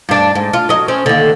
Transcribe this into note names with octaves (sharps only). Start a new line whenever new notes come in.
G2 D4
G#2
F4
F#3 D#5
C4 C#4
D#2 D3